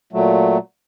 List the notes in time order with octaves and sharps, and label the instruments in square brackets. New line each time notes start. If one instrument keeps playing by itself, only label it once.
[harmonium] A#2 F#3 A3